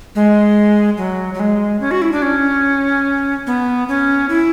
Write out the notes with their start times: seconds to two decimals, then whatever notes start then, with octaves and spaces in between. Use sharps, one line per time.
0.15 G#3
0.97 F#3
1.34 F#3
1.40 G#3
1.81 C#4
1.91 F#4
2.02 E4
2.12 D4
2.22 C#4
3.47 B3
3.88 C#4
4.29 E4